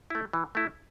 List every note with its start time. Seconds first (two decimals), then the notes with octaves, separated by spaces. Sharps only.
0.10 A3 E4
0.33 E3
0.55 A3 E4